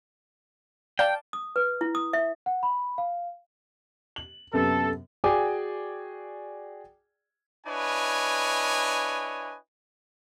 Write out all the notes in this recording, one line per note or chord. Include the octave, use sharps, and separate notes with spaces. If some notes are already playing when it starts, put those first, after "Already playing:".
D5 F5 G5 A5 G6
D#6
B4
E4
D#6
E5
F#5
B5
F5
F#7
F#2 C3 B3 A4
F#4 G#4 D5 G5 G#5 D6
D4 E4 B4 C#5 D#5 G#5